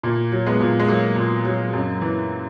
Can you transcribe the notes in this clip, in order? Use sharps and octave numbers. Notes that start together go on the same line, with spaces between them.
A#2 A#3
F#3
G#3 B3
A#2
G#3
F#3 A#3
A#2
F#3
F#2
E3